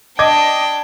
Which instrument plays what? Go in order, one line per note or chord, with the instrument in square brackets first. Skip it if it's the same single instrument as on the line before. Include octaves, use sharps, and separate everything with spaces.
[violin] D4 G5 [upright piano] D#5 D6 G#6